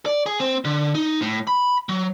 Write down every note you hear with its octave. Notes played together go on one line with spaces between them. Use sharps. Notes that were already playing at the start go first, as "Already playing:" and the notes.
D5
G#4
C4
D3
D#4
A2
B5
F#3